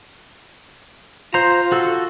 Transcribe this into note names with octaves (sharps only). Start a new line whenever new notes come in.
F4 C5 A#5
F#4 A4